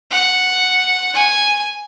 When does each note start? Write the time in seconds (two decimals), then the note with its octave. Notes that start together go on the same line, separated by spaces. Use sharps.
0.11 F#5
1.14 G#5